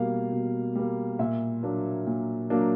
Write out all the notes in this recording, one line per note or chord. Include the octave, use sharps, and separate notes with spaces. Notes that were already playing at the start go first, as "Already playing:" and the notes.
Already playing: B2 G3 A#3 F5
B2
G3 A#3
A#2 E5
F#3 A#3 D4
A#2
F#3 A#3 D4